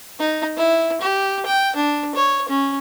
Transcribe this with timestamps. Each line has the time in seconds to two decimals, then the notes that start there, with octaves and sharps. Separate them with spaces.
0.19 D#4
0.57 E4
1.01 G4
1.46 G5
1.76 D4
2.15 C#5
2.49 C#4